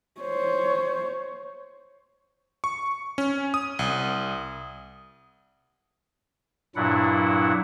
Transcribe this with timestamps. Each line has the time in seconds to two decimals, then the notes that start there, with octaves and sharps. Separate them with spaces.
0.21 C5 C#5
2.64 C#6
3.18 C#4
3.54 D#6
3.79 C2
6.76 G2 A#2 F#3 D4 E4 F#5